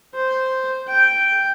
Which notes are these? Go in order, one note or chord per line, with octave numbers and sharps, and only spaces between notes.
C5
G5